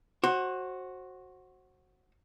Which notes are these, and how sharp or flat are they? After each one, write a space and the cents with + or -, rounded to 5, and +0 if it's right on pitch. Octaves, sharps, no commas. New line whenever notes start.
F#4 +0 C5 +30